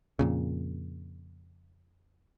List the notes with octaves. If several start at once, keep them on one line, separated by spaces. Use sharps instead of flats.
F2 A#2 C#3